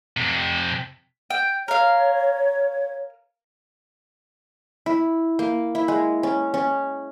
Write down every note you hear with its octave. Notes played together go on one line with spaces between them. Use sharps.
F2 C3
G5
A#4 C#5 F5
E4
A#3
E4
G#3
C#4
C#4